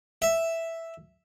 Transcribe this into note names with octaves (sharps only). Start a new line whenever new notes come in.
E5